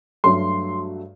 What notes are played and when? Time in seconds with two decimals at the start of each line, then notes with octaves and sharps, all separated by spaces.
0.24 G2 F#3 A3 C6